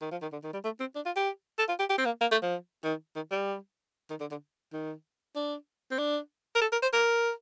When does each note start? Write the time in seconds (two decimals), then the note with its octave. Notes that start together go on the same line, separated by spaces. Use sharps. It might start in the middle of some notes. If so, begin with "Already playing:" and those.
0.01 D#3
0.11 F3
0.22 D#3
0.33 D3
0.43 D#3
0.53 G3
0.64 A3
0.80 C4
0.95 D4
1.06 F4
1.16 G4
1.58 A4
1.68 F4
1.79 G4
1.90 G4
1.98 C4
2.05 A#3
2.21 A#3
2.31 A3
2.42 F3
2.84 D#3
3.15 D#3
3.31 G3
4.10 D#3
4.20 D3
4.31 D3
4.73 D#3
5.36 D4
5.91 C4
5.98 D4
6.55 A#4
6.61 A4
6.72 A#4
6.82 C5
6.93 A#4